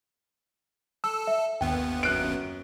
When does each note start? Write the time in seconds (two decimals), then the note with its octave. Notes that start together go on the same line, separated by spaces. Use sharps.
1.04 A4 E6
1.27 E5
1.61 G1 D#2 B3 G5
2.03 F#2 F#6 D7